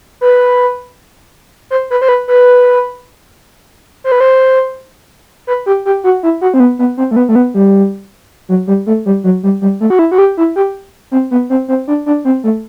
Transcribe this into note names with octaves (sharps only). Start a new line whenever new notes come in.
B4
C5
B4
C5
B4
B4
C5
B4
C5
B4
G4
G4
F#4
E4
F#4
C4
B3
B3
C4
A3
B3
A3
B3
G3
F#3
G3
A3
G3
F#3
G3
G3
A3
F#4
E4
F#4
G4
E4
G4
C4
B3
C4
C4
D4
D4
C4
A3